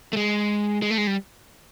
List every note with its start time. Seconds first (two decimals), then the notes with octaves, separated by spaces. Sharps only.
0.13 A3
0.17 G#3
0.82 G#3
0.91 A3
0.98 G#3
1.07 G3